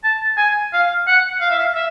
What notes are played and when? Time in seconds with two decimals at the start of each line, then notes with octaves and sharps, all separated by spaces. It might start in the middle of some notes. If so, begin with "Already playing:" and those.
0.04 A5
0.38 G#5
0.73 F5
1.07 F#5
1.41 F5
1.51 E5
1.59 F5
1.75 E5